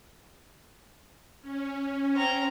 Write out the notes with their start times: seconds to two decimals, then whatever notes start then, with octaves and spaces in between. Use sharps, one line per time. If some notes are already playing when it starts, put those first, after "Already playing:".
1.41 C#4
2.14 C4 A#5